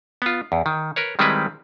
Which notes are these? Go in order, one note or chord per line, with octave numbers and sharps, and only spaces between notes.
B3 F4
E2
D#3
A#4 B4 C#5
D#3 G3 G#3 C4 E4 B4